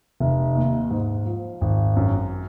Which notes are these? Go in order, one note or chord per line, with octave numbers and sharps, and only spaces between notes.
F1
D#2
G#2
F3
G#1
F#2